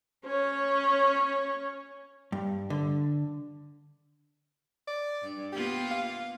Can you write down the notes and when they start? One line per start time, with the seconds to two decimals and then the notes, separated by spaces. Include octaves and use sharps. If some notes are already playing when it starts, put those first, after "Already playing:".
0.25 C#4 C#5
2.32 G2
2.70 D3
4.87 D5
5.23 G2
5.52 A#3 B3 F4 G4
5.91 F5